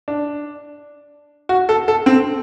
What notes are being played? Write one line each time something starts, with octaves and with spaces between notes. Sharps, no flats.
D4
F#4
A4
A4
C4